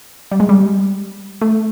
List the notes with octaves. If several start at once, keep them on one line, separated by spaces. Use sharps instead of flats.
G3
G#3
G3
A3